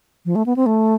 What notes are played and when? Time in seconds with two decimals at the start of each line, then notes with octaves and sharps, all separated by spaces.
0.25 F3
0.35 A3
0.46 B3
0.56 C4
0.66 A3